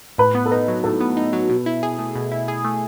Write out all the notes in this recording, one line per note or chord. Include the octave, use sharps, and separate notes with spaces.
A2 B4
B3
A4
D#4 B4
F#3
A2 A4
B3
D#4
F#3
B2
E4
G#4
A3
B2
E4
G#4
A3